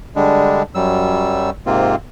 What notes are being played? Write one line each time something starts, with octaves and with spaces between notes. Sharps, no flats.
D3 G3 G#3 D4
F#2 F#3 G3 E6
G#2 C3 A#3 C4 F4